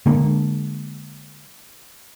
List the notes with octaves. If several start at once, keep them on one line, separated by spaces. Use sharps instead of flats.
D3 G#3 A#3 D4